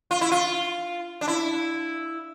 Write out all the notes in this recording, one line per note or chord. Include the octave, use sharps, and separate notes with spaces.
F4
E4
F4
D4
E4